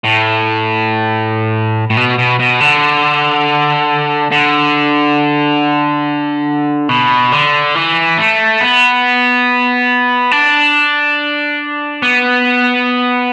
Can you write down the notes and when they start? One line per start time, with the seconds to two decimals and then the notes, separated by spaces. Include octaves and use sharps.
0.04 A2
1.90 A2
1.97 B2
2.18 B2
2.39 B2
2.61 D3
4.32 D3
6.89 B2
7.32 D3
7.75 E3
8.17 A3
8.61 B3
10.32 D4
12.03 B3